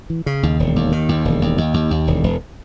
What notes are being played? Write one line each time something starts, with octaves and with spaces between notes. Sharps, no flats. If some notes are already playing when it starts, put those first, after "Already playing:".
E3
C#3
D#2
E1
D#2
D#3
D#2
E1
D#2
D#2
D#2
D#2
E1
E1